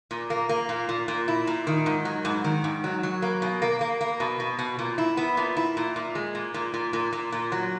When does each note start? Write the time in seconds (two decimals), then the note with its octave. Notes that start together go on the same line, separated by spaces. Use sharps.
0.11 A#2
0.30 A#3
0.49 A#3
0.69 A#2
0.89 A#2
1.08 A#2
1.28 E4
1.47 A#2
1.67 D#3
1.86 G#2
2.05 F#3
2.25 G#2
2.44 D#3
2.64 G#2
2.84 F#3
3.03 F#3
3.22 A#3
3.42 B2
3.62 A#3
3.81 A#3
4.01 A#3
4.20 B2
4.40 B2
4.59 B2
4.79 A#2
4.98 E4
5.17 B3
5.37 A#2
5.57 E4
5.77 A#2
5.96 A#2
6.15 G#3
6.35 A#2
6.54 A#2
6.74 A#2
6.93 A#2
7.13 A#2
7.32 A#2
7.52 F#3